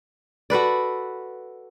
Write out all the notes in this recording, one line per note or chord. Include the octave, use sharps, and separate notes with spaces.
F#4 A4 B4 D5